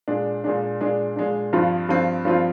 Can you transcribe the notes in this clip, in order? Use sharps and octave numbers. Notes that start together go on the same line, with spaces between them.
A#2 G#3 D4
A#2 G#3 D4
A#2 G#3 D4
A#2 G#3 D4
G2 F3 C4 F4
G2 F3 C4 F4
G2 F3 C4 F4